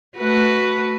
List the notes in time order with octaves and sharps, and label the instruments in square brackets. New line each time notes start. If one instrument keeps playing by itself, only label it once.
[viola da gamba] A3 F#4 B4